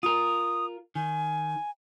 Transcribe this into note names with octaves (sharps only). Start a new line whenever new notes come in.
F4 A#4 D#6
D#3 G#5